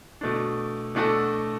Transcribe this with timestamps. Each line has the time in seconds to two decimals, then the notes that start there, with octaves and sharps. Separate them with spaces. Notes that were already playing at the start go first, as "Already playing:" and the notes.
0.21 B2 A3 D4
0.95 B2 A3 D4 F#4 A4